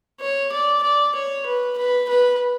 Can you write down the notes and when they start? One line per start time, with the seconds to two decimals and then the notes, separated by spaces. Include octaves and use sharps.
0.20 C#5
0.52 D5
0.83 D5
1.15 C#5
1.46 B4
1.78 B4
2.09 B4